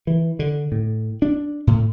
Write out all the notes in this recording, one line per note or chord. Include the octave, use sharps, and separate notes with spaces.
E3
D3
A2
D4
A2